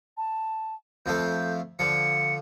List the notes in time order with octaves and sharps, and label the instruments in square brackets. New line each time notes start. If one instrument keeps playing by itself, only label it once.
[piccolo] A5
[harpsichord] F2 F3 A3 [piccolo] G6
[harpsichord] D3 F3 [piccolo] C#7